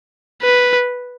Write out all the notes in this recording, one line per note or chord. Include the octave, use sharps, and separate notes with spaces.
B4